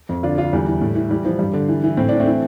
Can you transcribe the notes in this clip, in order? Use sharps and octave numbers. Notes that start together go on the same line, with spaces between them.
F2
D3 D4 F4
D3 D4 F4
E2 G3
E3
A2
E3
E3 G3
E3 F3
G2 G3
D3
E3
E3
A2 C4
E3 D4
A3 C4
E3